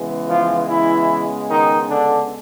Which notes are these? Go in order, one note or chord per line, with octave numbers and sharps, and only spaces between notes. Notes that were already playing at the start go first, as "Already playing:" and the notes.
Already playing: C#3 E3 G#3 B3
F3 F4
E3 E4
D#3 D#4
D3 D4